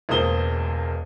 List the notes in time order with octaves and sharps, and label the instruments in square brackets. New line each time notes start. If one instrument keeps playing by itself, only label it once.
[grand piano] E1 C#2 A#3 C5 D#6 G7